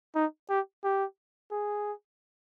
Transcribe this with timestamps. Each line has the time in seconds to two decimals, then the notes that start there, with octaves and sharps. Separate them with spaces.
0.15 D#4
0.49 G4
0.84 G4
1.51 G#4